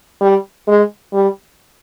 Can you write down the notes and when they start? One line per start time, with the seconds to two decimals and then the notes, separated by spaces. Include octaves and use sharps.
0.21 G3
0.68 G#3
1.13 G3